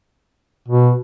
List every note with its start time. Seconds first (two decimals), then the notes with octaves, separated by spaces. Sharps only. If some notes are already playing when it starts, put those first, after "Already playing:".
0.68 B2